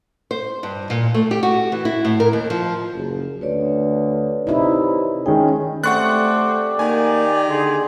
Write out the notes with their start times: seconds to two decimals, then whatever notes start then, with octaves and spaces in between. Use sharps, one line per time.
0.31 C5
0.63 G2
0.90 A#2
1.14 A3
1.31 G4
1.43 F#4
1.72 E3
1.85 E4
2.05 A2
2.20 A#4
2.33 D#2
2.50 F3
2.94 F#1
3.41 D2 B4 C#5 D5
4.47 C3 D#4 E4
5.26 D#3 G#3 C#4 G#4 G5
5.84 A3 C4 G4 D5 F#5 C#6 F#6
6.79 D#3 A#3 G#5
7.48 D3 G#4 C6